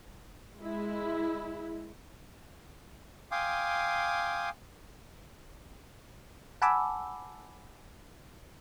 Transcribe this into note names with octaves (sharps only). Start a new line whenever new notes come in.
G#3 E4
F5 G5 G#5 C6 D6 D#6
F#5 G#5 A5 B5 D6 E6